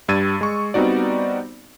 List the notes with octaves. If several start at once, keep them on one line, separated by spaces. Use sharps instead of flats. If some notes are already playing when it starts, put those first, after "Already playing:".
G2 G3 E6 G#6 A6 D#7
G#3 C#6
G3 B3 C4 D#4 F#4 D5